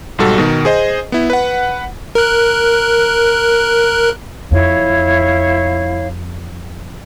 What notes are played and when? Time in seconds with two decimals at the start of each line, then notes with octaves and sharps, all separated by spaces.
0.18 B1 G#2 G3 F#4 A4
0.38 B2 D#3
0.65 G#4 C5 D#5
1.12 B3 E4
1.30 B4 F#5
2.15 A#4 F#6
4.51 F2 E4 C#5 F5